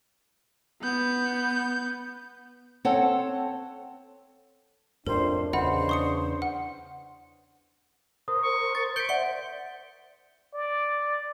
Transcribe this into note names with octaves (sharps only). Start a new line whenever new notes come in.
B3 G6
C4 A4 C#5 F#5 A5
F2 A2 D4 A#4 C5
E2 C#3 C5 D#5 F#5 B5
C#6 D#6 C#7
F#5
A#4 C5 D#6
C#6
A6
C5 G6 B6 C#7 D7 G7
D5 E5 F#5 C#7 G7
D5